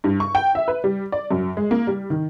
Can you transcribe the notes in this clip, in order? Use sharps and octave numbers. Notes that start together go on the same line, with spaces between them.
G2
C#6
G5
E5
B4
G3
D5
F#2
G#3
A#3
G3
D#3